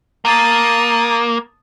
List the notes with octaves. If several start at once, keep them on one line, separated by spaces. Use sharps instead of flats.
A#3 A5 D#6